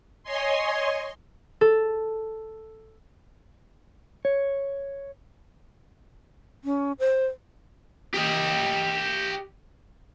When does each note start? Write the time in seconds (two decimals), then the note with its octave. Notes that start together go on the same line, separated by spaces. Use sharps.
0.23 C#5 D#5 G#5 C6
1.61 A4
4.25 C#5
6.64 C#4
6.99 C5
8.14 G4 D#5